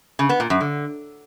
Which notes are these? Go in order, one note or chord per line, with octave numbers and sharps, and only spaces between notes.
C#3
B3
A#2
F#2
D3